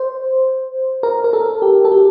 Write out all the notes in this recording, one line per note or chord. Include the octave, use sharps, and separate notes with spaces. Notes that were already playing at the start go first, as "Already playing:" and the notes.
Already playing: C5
A#4
A#4
A4
G4
A4
G4